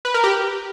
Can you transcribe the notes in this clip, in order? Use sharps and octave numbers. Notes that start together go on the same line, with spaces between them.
B4
A#4
G4